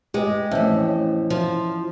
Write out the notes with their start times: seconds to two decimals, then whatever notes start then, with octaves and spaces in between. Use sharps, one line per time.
0.14 G#3 G4 B4 D#5
0.51 F2 A2 E3 C#4 E5
1.30 F3 E4 F4